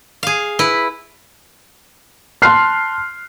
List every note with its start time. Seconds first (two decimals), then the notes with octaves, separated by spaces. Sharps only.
0.23 G#4 F5
0.59 E4 B4
2.42 A5 C6 F6 F#6 C7